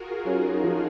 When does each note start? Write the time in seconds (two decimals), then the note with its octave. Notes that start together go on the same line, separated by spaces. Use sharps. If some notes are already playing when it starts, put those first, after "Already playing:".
Already playing: F4 F#4 G#4 A#4
0.25 F#3 C#4 D#4 F#4
0.64 F3